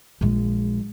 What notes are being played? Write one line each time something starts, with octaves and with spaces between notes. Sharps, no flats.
A#1 G#3